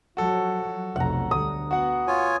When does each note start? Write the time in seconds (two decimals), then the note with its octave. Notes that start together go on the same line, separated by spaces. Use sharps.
0.17 F3 F#3 F#4 A4
0.96 F1 B1 F#5 A#5
1.31 D2 D3 G3 D#6
1.71 B3 F#4 F#5
2.07 F4 C#5 G#5